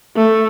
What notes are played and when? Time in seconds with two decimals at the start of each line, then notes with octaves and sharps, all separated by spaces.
0.16 A3